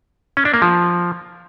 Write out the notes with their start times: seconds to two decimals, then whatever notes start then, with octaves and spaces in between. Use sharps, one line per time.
0.37 C#4
0.45 D4
0.54 A#3
0.62 F3